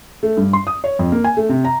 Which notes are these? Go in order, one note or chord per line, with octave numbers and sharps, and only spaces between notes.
A3
G2
C6
D#6
C#5
F2
A#3
G#5
A3
C3
A#5